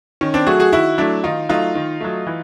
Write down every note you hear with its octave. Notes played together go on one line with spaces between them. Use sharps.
D#3 C#4
C4 D4
F#3 A3 F#4 G#4
F#4 G#4
D#3 E4 F#4
F#3 A3 D4 E4
D#3 D#4 F4
F#3 A3 D#4 F4
D#3
F#3 A3
E3